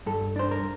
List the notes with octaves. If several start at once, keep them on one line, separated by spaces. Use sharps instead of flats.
G2 A4
D4 C5
A#4